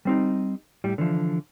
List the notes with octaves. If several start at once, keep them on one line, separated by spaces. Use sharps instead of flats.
G3 C4 D#4
A2 G3
D3 E3 F3